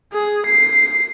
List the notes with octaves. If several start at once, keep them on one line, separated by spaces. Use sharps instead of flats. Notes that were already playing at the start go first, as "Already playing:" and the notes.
G#4
C7